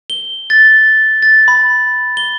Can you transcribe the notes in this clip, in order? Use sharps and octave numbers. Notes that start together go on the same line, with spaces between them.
G7
A6
A6
B5
G7